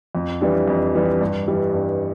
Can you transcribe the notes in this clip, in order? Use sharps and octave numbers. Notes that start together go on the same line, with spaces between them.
F2
E3 G3 D4
F2
E3 G3 D4
G2
E3 G3
G2